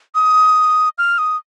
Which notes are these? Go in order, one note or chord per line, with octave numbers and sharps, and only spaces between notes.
D#6
F6
D#6